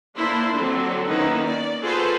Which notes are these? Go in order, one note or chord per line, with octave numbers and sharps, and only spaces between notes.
A#3 D4 E4 C5
D3 F#3 C4
D#3 A#3 B3 C#4 D#4 E4
D5
F4 F#4 G#4 A4 B4 C5